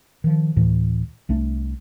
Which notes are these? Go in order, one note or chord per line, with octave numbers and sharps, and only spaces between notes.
D#3 F3
D2 A2 E3
C2 A3 D4